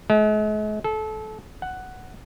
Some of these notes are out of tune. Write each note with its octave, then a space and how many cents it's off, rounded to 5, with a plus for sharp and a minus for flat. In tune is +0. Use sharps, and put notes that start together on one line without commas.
G#3 +45
A4 -25
F#5 +5